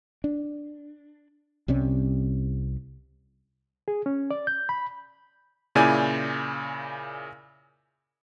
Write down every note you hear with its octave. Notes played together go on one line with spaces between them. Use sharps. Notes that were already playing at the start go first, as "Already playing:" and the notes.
D4
C2 C3 G3 C#4
G#4
C#4
D5
G6
B5
A#2 C#3 E4 D5 G#5 G6